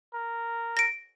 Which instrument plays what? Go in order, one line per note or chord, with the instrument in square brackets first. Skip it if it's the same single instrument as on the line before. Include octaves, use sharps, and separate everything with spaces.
[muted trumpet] A#4
[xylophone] A#6 D7